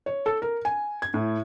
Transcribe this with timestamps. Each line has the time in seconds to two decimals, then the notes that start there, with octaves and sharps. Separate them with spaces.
0.06 C#5
0.26 A4
0.42 A#4
0.65 G#5
1.02 G#6
1.14 A2